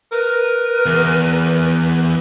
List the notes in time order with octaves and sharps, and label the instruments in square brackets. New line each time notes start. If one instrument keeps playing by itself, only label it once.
[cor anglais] A#4 [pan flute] B4
[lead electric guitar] E2